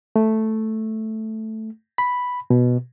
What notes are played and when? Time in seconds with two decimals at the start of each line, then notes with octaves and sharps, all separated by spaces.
0.16 A3
1.98 B5
2.50 B2